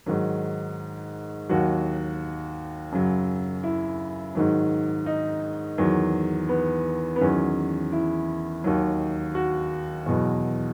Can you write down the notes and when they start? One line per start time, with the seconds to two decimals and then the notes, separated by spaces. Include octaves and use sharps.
0.06 G#2 D#3 F#3
1.49 D#2 D#3 F#3 F#4
2.92 F#2 C#3 F#3
3.63 E4
4.35 G#2 D#3 F#3
5.06 D#4
5.78 E2 D#3 F#3
6.49 B3
7.16 B3
7.21 E2 D#3 F#3 C#4
7.92 E4
8.64 D#2 D#3 F#3
9.35 F#4
10.06 E2 B2 F#3